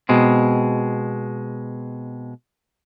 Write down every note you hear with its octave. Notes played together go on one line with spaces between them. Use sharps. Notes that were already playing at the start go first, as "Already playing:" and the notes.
B2 G#3 C4